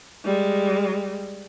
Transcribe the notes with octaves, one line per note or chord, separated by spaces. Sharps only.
G3 G#3